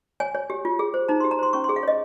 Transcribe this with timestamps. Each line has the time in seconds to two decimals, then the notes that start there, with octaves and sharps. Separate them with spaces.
0.20 C#5 G#5
0.35 C#5
0.50 G4
0.65 F4
0.79 G#4
0.94 C5
1.08 D#4 A#5
1.20 G4 C6
1.31 A#5
1.39 C5 C6
1.53 C#4 C#6
1.64 G#4 C6
1.76 F5
1.83 C#5 D#5